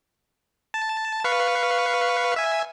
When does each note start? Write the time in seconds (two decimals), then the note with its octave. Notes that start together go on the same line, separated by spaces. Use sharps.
0.74 A5
1.24 B4 F5 C#6
2.36 E5 G#5